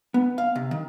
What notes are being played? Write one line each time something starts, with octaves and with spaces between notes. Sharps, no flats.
B3
F5
C3
D#3